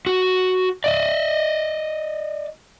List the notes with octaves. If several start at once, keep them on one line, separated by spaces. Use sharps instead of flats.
F#4
D5 D#5